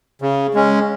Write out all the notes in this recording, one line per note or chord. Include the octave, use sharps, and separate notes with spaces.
C#3
G#3 C#4